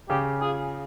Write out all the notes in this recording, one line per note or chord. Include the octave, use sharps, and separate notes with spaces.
C#3 G4
F4 G#4